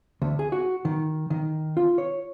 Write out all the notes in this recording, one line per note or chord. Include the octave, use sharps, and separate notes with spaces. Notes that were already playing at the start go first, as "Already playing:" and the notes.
D2
G#4
F#4
D#3
D#3
F4
C#5